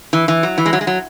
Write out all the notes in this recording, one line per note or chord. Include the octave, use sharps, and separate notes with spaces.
E3
E3
F#3
E3
G#3
F#3
G#3
F#3